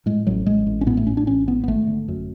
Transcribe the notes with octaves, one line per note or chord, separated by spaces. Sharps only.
A2 G#3
A1 F#3
A1 G#3
A1
C#4
A2 B3
A3
A2 C#4
D4
A1 C#4
A2 B3
B3
G#1 A3
D3
F#2